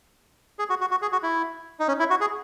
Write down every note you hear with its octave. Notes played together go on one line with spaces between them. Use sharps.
G#4
F#4
F#4
F#4
G#4
F#4
E4
D#4
C#4
E4
F#4
G#4